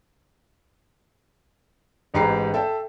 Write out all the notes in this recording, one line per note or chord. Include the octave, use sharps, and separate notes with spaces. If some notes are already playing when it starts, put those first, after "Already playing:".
A1 G#2 G4 B4 A#5 C7
A4 E5 G5